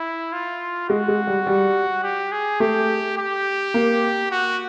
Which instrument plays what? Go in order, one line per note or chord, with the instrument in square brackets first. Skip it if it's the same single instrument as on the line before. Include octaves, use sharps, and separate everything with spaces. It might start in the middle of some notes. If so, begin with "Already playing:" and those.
Already playing: [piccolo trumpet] E4
F4
[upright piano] G#3 [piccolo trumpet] F#4
[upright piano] G#3
G3
G3
[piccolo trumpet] G4
G#4
[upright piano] A3 [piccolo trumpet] G4
[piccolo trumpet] G4
[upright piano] A#3
[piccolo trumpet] F#4